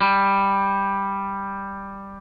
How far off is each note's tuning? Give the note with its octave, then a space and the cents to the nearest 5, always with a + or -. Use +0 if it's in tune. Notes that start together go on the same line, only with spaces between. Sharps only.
G3 +5